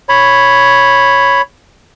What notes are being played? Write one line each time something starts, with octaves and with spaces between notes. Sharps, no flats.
C#5 B5